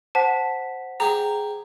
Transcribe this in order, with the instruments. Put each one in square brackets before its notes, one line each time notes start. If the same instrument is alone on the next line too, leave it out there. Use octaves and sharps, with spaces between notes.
[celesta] C5 F#5 B6 [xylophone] A5
[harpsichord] G4 G#4 [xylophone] A#5